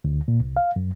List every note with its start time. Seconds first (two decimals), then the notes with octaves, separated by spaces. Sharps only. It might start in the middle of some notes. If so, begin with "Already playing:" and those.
0.04 D2
0.28 A#2
0.40 C2
0.57 F5
0.76 F#2